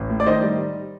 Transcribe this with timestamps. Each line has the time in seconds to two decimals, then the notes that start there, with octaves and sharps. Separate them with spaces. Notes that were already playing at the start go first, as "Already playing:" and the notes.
Already playing: A1
0.10 A2
0.20 D5
0.26 D#3 C5 D#5
0.43 G3